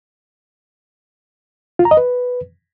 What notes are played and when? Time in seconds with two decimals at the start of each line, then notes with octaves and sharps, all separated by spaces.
1.79 F4
1.85 A#5
1.91 D#5
1.97 B4